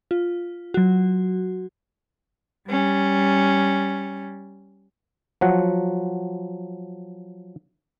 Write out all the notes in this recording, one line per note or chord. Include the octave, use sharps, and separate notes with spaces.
F4
F#3 F#4
G3 C#4
F3 F#3 F#5